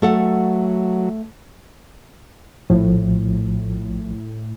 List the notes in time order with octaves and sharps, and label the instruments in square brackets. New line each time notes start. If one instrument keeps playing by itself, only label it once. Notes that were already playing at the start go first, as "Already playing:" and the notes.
[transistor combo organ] F#3 [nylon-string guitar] A3 A4 F#5
[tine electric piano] A#1 F3 [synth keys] A2